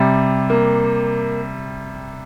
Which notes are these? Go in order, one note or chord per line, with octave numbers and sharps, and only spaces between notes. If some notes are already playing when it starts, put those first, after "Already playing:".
Already playing: C3 G3
A#3